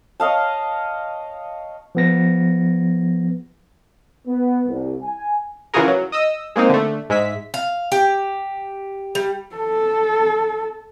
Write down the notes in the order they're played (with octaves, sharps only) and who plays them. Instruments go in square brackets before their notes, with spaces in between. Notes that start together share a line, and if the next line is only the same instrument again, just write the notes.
[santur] C#5 D#5 F5 A5
[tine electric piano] F3 B3 A#6
[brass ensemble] B3
C2
G#5
[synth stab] C#3 E3 F4 F#4 G#4 A#4
F#3
D#5 D#6 E6
G#3 A#3 C4 D#4
D3 A3
G#2 G#3 E5 B6
[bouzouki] F5
G4
G3
[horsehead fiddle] A4